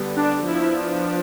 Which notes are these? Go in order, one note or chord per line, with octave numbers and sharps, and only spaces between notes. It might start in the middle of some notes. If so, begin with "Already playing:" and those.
Already playing: D3 G3 B3
D4
F3 B3 D4 E4